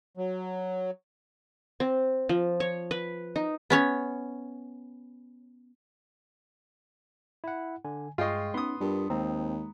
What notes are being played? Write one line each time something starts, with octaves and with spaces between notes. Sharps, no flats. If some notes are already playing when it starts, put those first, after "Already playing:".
F#3
C4
F3
C#5
B4
D#4
B3 C#4 C#5
E4 F#5
D3 G#5
G2 G#3 F4 D#5 G5 C#6 C7
B3 C#4 D#4 C6 D#6
G2 F4 G4 A#4
D#2 G#3 C4 A#5